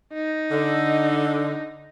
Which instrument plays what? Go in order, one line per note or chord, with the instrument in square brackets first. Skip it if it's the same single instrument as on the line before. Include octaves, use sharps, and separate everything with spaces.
[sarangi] D#4
[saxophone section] D3